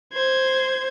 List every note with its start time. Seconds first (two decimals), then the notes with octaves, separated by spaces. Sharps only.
0.13 C5 G#6